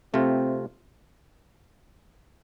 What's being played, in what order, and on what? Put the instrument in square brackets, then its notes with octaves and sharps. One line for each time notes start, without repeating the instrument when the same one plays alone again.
[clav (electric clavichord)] C3 A3 F4 [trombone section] C4